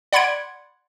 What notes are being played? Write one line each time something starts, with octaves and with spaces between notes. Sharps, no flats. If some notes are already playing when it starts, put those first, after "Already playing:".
D5 F#5 B5 C6 G#6 D7